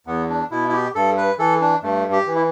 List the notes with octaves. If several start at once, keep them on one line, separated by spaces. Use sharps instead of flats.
E2 B3
D4
B2 E4
E4
G4
G2 A4
B4
E3 A4
D4
G2 A3
G4
E3
E4